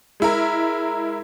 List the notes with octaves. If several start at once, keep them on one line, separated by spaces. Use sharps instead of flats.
G#3 E4 A#4